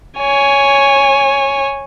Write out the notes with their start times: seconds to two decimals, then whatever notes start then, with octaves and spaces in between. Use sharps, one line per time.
0.19 C#5 G#5